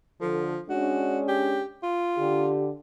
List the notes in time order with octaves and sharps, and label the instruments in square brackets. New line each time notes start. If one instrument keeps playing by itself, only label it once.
[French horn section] D3 A4 [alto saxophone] F3
[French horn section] G#3 C#4 D4 [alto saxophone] F#4
[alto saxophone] G4
F4
[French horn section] D3 G4